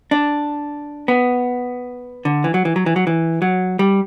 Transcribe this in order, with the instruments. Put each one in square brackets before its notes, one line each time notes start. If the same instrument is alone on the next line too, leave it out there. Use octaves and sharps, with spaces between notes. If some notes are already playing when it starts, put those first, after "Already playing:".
[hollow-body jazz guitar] D4
B3
D3
E3
F#3
E3
F#3
E3
F#3
E3
F#3
G3